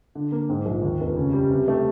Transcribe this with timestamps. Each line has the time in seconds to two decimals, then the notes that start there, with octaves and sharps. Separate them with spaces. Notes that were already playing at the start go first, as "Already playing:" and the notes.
0.15 D3
0.32 A#3
0.49 G#2
0.66 A#1
0.82 D#2
1.00 F1
1.16 C#3
1.33 G3
1.50 C3
1.68 A3